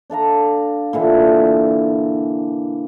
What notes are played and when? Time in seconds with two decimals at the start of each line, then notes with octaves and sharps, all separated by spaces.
0.10 D4 A4 F5 A#5
0.93 A#2 D3 E3